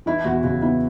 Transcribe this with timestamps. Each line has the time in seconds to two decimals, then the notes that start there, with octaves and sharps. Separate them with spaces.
0.06 E3 E4
0.25 E2 F#4
0.44 C#3 F#4
0.62 B3 E4